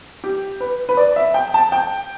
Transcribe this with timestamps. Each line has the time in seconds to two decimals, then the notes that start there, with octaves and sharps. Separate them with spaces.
0.24 G4
0.60 B4
0.89 B4
0.97 D5
1.16 E5
1.34 G5
1.54 A5
1.72 G5